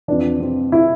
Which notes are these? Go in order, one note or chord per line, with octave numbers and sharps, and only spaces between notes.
F2 E3 D4
C4
E4